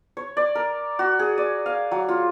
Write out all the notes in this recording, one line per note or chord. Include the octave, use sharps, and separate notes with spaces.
C#5
D5
A#4
F#4
G#4
D5
F5
F#3
F4